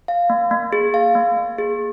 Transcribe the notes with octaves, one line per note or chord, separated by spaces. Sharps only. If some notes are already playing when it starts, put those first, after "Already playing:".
F5
A#3
A#3
G#4
F5
A#3
A#3
G#4